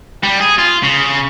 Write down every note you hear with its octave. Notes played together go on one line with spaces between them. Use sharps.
G3
G#4
F4
C#3